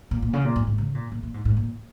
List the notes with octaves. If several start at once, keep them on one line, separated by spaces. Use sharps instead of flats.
A#2
A#2
C#3
A#2
G#2
G#2
C#3
A#2
A#2
A#2
G#2
G#2
A#2